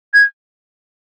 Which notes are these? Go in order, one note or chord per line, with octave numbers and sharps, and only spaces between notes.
G#6